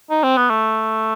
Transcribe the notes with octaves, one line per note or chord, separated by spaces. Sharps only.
D#4
C4
B3
A3